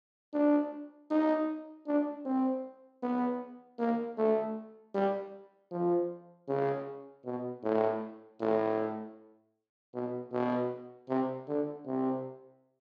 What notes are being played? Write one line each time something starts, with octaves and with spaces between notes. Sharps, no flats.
D4
D#4
D4
C4
B3
A#3
A3
G3
F3
C#3
B2
A2
A2
B2
B2
C3
D3
C3